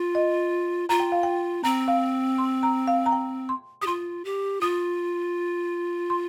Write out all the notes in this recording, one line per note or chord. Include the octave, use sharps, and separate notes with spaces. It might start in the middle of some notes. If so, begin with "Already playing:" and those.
Already playing: F4
D#5
F4 A#5
G5
F5
G5
C4 A#5
F5
C6
A#5
F5
A#5
G5
C6
G4 D#6
F4 C6
G4
F4 D#6
C6